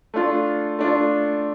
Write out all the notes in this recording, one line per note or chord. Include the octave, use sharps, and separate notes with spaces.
A3 D4 F4
A3 D4 F4